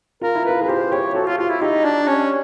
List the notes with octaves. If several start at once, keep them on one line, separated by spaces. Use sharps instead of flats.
F4 A#4
E4
F4 B4
G#4 B4
G4 C5
G4 C#5
F#4 A4
F4
F4 G4
E4
D#4 G4
D4
C#4